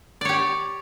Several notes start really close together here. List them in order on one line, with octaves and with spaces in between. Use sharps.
D5 C#5 G4